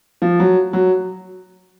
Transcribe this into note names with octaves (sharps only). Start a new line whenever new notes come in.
F3
F#3
F#3